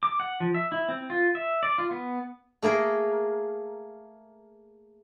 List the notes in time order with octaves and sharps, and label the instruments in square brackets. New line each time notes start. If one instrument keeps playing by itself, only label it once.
[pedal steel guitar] D6
F#5
F3
E5
E4
C4
F4
E5
D5
F4
B3
[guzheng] A3 A#3 G#4 A#4